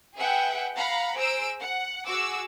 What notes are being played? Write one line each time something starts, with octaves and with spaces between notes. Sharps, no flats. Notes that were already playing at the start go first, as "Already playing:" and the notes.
G#4 B4 E5 F#5 G5
F5 F#5 A#5 B5
G#4 C5 A#5 E6 D7
F#5
F#4 G#4 D6 E6